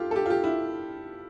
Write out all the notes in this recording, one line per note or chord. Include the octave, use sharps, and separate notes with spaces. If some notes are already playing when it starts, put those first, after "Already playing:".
Already playing: F4 G4 A4
A4
G4
F4
G4
E4